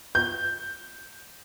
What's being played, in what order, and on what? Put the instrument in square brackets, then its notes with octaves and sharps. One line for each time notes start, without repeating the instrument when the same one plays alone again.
[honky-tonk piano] G6